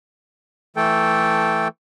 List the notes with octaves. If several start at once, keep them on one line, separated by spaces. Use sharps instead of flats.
E3 A3 A4 G5